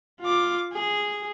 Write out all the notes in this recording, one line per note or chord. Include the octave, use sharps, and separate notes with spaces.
F4 D6
G#4